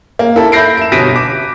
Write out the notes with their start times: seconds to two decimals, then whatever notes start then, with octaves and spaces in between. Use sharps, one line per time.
0.19 A#3
0.36 E4 A4
0.52 E5 B5 G6 A#6 C7 D7
0.77 D7 E7
0.92 G1 B2 A#6 B6 D7 D#7
1.16 D6